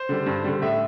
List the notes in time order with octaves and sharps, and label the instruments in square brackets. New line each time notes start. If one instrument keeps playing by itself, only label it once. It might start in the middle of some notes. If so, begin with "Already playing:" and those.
Already playing: [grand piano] C5
[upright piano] D3 G3
G2
D3 G3
[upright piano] A2 [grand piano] E5